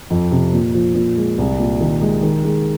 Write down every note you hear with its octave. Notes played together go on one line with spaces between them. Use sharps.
F2
C3
A#2
F3
A#2
G#3
C2
A#2
D#3
G#3
D#3
G#3